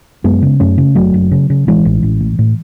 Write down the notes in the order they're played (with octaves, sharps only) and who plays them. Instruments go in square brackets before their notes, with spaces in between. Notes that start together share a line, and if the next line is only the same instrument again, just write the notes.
[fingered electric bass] F#2 G#3 B3
C#3
F#2 A3 C#4
C#3
F#1 F#3 A3
F#1
C#3
C#3
A1 E3 G#3
A1
A1
A2
A2